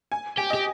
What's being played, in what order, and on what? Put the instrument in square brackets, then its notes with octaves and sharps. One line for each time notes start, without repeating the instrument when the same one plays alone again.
[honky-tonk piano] G#5
[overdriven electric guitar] G4 [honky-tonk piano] G#5
[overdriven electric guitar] G4 [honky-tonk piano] D#5